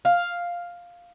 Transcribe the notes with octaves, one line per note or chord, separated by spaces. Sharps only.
F5